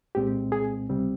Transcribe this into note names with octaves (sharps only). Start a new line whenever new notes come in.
C2 A#2 G#3 C4 G4
G#4
C#2 C3 G3 C4